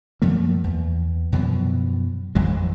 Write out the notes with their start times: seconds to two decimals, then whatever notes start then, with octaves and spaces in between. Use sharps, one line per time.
0.22 F#2 F3 A3 A#3
0.64 E2
1.32 F#2 B2 E3 F3
2.35 A1 F2 E3 G#3